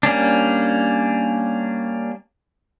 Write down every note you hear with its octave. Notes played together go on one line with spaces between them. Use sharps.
G3 A#3 C#4 D4